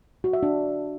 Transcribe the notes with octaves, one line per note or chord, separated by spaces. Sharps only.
F#4
E5
D4